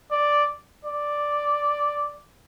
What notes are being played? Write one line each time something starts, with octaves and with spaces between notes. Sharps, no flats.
D5
D5